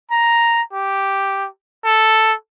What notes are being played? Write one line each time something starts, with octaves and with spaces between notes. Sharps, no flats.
A#5
G4
A4